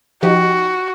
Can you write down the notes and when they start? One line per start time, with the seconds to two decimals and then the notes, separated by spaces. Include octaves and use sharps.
0.23 F3 D#4 F#4 G4